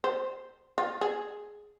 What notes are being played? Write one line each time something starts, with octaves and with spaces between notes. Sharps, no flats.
C5
F4
G#4